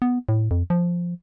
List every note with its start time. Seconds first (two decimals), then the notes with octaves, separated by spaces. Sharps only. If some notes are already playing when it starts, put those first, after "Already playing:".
0.02 B3
0.29 A2
0.51 F2
0.70 F3